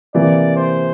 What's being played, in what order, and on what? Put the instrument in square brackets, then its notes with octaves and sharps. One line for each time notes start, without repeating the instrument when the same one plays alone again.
[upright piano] C3 E3 A#3 [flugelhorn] D5
[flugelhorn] C5